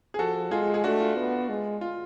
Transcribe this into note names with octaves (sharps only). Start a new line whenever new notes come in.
G#4
F3 F#4 A4
G#3 F4 G#4
G#4
A3 D4 F#4
F4
B3
G#3
F4